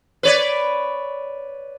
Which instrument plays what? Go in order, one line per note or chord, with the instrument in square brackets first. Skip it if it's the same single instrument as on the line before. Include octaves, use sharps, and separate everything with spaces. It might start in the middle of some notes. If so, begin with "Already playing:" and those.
[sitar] B4 C#5 D5